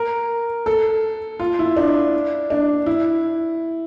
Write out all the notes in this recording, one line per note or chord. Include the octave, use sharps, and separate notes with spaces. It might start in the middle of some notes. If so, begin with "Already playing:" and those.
Already playing: A#4
A4
F4
E4
D4
D4
E4